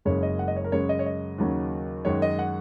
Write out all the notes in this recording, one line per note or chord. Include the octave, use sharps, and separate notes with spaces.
F#1 F#2 C#3 G#3 C#5
D#5
F#5
D#5
C#5
A#4
F#2 C#3 G#3 C#5
D#5
C#5
D#5
D#2 C#3 F#3
F#2 D#3 G#3 C#5
D#5
F#5